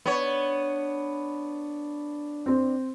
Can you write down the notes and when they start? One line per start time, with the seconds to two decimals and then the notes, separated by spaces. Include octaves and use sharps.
0.06 B3 D4 C#5
2.46 C4 C5